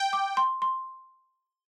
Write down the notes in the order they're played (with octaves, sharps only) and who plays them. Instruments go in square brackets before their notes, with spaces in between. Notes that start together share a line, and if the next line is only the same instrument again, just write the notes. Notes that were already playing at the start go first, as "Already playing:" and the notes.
Already playing: [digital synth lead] G5
[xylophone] D6
C6
C6